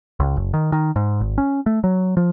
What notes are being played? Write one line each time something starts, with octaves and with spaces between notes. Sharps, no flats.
C#2
F#1
D#3
D#3
G#2
G#1
C#4
A3
F#3
F3